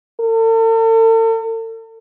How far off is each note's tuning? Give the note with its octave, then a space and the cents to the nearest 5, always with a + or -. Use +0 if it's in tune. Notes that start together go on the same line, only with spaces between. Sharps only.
A4 +45